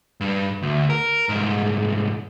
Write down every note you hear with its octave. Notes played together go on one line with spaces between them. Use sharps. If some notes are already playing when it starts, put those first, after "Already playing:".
G2
D2
A#4
C2 G#2